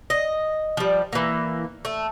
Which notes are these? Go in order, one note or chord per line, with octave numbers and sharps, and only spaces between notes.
D#5
F3 G3
E3 A#3
A3